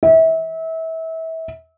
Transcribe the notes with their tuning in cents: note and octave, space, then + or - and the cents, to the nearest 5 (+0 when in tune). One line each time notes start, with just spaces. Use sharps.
E5 -30